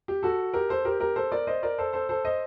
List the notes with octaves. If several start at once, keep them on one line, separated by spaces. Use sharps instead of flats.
G4
F#4 A4
G4 A#4
A4 C5
G4 A#4
G4 A#4
A4 C5
A#4 D5
C5 D#5
A#4 D5
A4 C5
A4 C5
A4 C5
C5 D#5